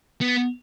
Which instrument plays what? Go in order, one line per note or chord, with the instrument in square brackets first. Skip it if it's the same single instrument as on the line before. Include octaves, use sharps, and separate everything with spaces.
[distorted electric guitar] B3